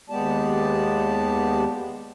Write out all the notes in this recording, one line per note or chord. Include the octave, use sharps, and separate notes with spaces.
D#2 G#3 B3 G4 D5 A5